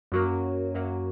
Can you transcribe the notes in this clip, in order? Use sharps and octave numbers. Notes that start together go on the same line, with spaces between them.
F#2 F#3 A#3
F#2 F#3 A#3